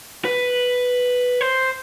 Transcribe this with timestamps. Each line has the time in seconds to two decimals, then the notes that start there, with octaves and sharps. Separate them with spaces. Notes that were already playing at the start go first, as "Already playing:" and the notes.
0.25 B4
1.41 C5